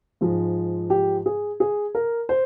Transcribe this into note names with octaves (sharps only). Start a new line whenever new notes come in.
G#2 F3 G#3
G4
G#4
G#4
A#4
C5